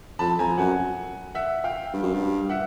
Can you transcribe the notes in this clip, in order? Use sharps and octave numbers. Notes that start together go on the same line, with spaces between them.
F2 A5 B5
F2 G#5 A#5
F#2 F#5 G#5
E5 F#5
F5 G5
G2
F#2
G2
E5 F#5